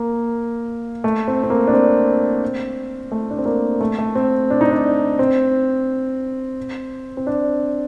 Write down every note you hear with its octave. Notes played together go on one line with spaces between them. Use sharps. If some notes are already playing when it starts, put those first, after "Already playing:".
Already playing: A#3
A3
C4
C4
A#3
D4
C4
A3
D4
C4
A#3
A3
A3
C4
D4
D#4
D4
C4
C4
D4